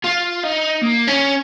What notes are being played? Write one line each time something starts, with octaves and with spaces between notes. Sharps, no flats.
F4
D#4
A#3
C#4